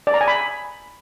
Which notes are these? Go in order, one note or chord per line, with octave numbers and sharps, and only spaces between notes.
D5
A#5
G#5
B5